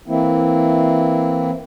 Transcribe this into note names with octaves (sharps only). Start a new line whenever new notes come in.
E3 A#3 C4 E4